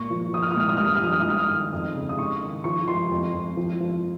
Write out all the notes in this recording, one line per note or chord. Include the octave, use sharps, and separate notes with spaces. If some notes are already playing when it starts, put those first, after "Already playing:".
Already playing: A#2 C#6
F3
F3 D#6
F6
D#6
A#2 F6
D#6
G2 F6
D#6
F6
F3 D#6
F6
D#6
G#2 F6
D#6
D#3
F2
C#3
D#6
G#2 C#6
D#3
F3 C#6
F3 C6
F2
F2
F3
F3